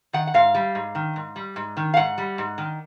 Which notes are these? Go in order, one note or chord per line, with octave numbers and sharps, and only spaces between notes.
D#3 F#5
F#5
G#2 F5
G3
G#2
D#3
G#2
G3
G#2
D#3
F5
G#2 F#5
G3
G#2
D#3